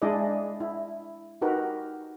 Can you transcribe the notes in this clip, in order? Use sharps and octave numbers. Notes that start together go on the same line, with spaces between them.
G#3 D4 E4 G#4 D5 D#5
E4
D#4 F#4 G4 A#4 B4